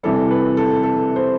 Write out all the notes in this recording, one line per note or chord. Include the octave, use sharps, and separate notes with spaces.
C3 E3 G3 A4
B4
A4
A4
C5